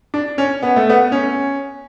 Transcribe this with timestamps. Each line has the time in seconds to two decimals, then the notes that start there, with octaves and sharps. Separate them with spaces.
0.14 D4
0.38 C#4
0.62 B3
0.76 A3
0.90 B3
1.12 C#4